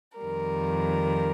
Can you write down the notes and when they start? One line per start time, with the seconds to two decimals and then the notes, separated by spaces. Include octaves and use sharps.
0.19 F2 D#3 G3 A#4